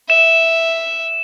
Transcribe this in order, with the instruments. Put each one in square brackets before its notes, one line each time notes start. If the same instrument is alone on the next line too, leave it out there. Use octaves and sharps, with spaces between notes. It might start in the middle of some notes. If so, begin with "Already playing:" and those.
[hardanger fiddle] E5 [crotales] E7